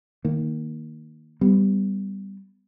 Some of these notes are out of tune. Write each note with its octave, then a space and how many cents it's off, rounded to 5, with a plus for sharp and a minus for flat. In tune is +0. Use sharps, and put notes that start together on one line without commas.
D#3 +0 A#3 +0
G3 +0 B3 +25